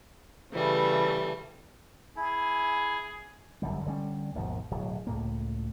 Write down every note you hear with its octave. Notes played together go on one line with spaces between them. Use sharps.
C#3 E3 G3 A3
E4 G#4
G1 F#2 D3 G3
D3 G3 C#4
G#1 D#2 B2 F3
D1 B2 F#3
C#2 A2 A#3